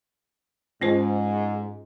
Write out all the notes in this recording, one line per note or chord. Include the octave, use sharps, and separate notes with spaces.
G#2 C#4 F4 C5